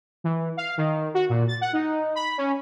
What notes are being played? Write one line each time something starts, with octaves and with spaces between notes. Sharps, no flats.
E3
F5
D#3
F#4
A#2
A6
F#5
D#4
B5
C#4